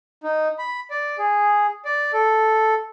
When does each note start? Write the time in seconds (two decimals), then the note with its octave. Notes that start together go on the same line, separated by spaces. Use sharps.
0.23 D#4
0.59 B5
0.90 D5
1.18 G#4
1.85 D5
2.13 A4